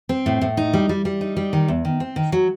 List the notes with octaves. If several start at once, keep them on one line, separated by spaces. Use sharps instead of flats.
C4
A2
A2
D#4
G3
G3
G3
D#4
G3
D#3
E2
D#3
C4
D#3
F#3